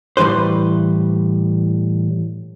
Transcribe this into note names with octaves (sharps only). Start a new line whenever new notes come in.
A2 E3 G3 B4 C5